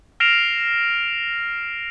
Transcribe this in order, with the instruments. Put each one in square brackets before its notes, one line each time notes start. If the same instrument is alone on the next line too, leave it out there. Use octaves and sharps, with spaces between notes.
[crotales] F6 A#6 C7 D7 E7 F7